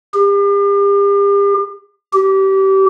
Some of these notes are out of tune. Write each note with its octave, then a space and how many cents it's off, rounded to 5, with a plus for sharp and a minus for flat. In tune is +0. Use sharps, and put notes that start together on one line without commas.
G4 +40
G4 -25